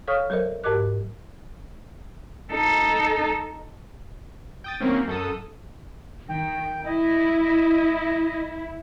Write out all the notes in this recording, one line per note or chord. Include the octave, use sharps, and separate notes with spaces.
A4 C#5 F5 C#6 D#6 F6
F#3 A4 A#4 C5 D#5
G#2 G4 A#4 D#5 D6 F#6
D#4 A4
G5 D#6 A6
D#3 F#3 A#3 C4 C#4
F#2 A4 D#6
D#3 G5
E4 D#5